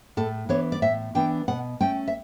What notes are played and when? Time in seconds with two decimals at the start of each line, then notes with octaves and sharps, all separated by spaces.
0.17 A2 A4
0.49 E3 B3 D4 C#5
0.72 D5
0.82 A2 E5
1.15 E3 B3 D4 G5
1.48 B2 F#5
1.80 A3 C#4 G5
2.08 E5